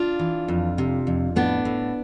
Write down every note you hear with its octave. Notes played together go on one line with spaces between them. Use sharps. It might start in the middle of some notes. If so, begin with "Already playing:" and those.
Already playing: D4 F4
E3
F2
C3
F2
A2 B3 D4
A2